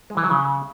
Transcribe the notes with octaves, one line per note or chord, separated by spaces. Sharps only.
G#3
E3
F#3
C#3